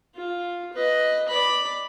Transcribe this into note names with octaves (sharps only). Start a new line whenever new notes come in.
F4
B4 D#5
D5 B5